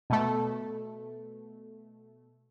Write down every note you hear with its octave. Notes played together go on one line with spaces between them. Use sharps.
B2 A3